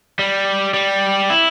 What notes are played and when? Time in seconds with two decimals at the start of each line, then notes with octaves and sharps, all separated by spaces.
0.19 G3
0.74 G3
1.30 E4